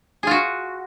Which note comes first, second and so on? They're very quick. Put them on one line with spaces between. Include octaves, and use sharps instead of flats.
G#4 F4 F#4